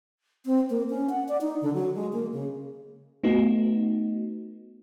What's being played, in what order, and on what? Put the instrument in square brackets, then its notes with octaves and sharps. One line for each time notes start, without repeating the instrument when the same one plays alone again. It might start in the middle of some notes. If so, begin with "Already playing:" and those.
[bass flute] C4
A#3
C#4
F#5
D5
D#4
D3
F#3
G#3
A#3
C#3
[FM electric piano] A3 B3 D#4 F#4